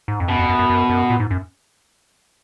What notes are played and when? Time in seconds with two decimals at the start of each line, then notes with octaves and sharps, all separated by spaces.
0.08 G#2
0.20 F2
0.28 F#2 B2
0.39 F2
0.49 F#2
0.59 F#2
0.70 F#2
0.89 F#2
1.10 A#2
1.20 G#2
1.31 F#2